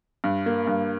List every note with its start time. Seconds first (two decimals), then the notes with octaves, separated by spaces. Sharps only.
0.24 G2
0.46 A#3
0.67 G2